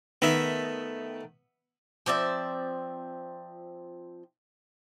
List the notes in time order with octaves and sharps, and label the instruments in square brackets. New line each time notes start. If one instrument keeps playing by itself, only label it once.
[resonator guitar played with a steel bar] D#3 A3 [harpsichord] B3 E5
[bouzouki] F3 C4 D5 E5